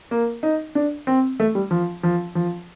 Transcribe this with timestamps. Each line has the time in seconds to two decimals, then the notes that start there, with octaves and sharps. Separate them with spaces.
0.11 A#3
0.43 D#4
0.75 D4
1.07 C4
1.40 A3
1.55 G3
1.71 F3
2.03 F3
2.35 F3